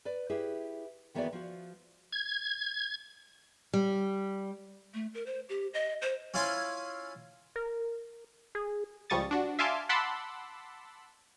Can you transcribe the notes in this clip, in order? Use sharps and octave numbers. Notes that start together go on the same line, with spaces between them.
B4 D5
E4 G4 G#4 B4
D#3 E3 B3 F#4 G#4 D5
F3 F#4
G#6
G3
A3
A#4
C5
G4
D#5
C5
C#4 E4 F4 F5 G#5 C6
A#4
G#4
C#2 F3 G3 C#6 D#6 A6
D4 F#4
E5 F5 G#5 A5 C6 D6
F#5 A5 B5 C6 D6 E6